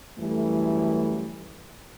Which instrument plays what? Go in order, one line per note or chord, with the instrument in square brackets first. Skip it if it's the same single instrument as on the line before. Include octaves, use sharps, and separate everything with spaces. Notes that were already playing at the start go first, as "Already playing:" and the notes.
[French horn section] F#2 E3 G3 A3